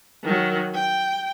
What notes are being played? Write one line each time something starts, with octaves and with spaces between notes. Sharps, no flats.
D#3 F#3
G5